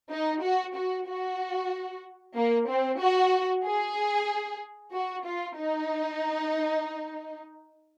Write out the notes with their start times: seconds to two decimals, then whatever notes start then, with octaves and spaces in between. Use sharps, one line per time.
0.11 D#4
0.43 F#4
0.76 F#4
1.08 F#4
2.36 A#3
2.69 C4
3.00 F#4
3.65 G#4
4.93 F#4
5.26 F4
5.57 D#4